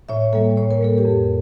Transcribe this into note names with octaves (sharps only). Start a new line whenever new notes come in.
A2 C#5 E5
G3 A#3 A4 C#5
A2 C#5
A#4
G3 A#3 A4
G4 A#4
F2